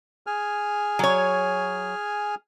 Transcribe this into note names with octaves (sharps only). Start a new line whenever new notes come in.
G#4 G#5 F6
F#3 C#5